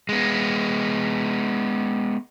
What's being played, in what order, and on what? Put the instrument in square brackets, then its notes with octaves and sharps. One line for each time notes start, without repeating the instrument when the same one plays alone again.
[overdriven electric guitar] G#3 B3